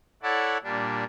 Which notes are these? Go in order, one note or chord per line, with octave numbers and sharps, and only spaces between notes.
E4 A4 C#5 D5 F#5
A#2 G3 D4